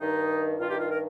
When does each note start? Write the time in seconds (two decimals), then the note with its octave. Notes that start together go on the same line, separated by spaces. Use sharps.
0.01 G2 D#3 D#4
0.60 G2 D#3 F4
0.70 G4
0.79 F4
0.91 A#4